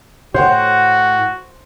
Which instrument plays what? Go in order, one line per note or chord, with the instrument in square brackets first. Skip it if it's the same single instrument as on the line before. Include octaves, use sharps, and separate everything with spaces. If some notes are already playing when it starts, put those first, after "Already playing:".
[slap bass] A2 [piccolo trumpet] F#4 [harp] C5 [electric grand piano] C#5 F#5 G5